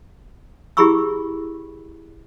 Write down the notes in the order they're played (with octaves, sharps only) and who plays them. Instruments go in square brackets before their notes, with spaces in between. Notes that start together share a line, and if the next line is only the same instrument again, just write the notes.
[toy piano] E4 G4 G#4 B5 C#6 E6